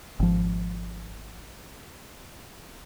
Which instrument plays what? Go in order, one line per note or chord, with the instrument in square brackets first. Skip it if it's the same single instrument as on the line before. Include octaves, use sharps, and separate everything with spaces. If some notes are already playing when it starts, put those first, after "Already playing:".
[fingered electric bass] G#1 F3